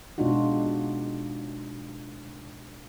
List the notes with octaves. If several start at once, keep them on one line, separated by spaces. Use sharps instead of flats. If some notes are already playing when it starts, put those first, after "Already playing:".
B2 G#3 D4 D#4 F4 F#4